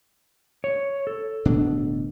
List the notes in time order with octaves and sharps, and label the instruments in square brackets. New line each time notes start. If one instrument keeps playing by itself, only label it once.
[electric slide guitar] C#5
A4
[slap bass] D1 B2 D4